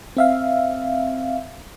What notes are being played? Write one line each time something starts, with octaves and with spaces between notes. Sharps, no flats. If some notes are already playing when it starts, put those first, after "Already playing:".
C4 E5 F5